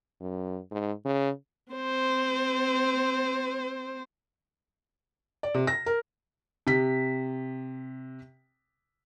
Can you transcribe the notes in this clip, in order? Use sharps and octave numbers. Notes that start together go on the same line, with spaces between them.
F#2
G#2
C#3
C4 C5
D5
C3
A#6
A#4
C3 B6